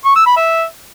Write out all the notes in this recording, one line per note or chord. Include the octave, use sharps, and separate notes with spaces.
C#6
E6
B5
E5